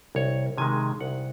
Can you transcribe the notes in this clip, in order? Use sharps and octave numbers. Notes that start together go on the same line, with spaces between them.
C2 C#5
C3 D#3 G#3 G#5
C2 F#5